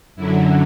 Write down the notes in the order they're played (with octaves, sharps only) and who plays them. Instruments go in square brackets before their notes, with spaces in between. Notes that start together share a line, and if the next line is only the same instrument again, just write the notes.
[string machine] F#2 D3 F#3 E4